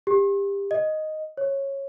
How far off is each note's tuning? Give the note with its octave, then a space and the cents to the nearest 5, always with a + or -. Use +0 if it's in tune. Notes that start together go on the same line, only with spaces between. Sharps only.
G4 +25
D#5 +0
C#5 -15